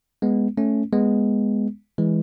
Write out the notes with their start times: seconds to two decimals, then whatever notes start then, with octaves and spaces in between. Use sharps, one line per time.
0.22 G#3 B3
0.57 A3 C#4
0.93 G#3 B3
1.98 E3 G#3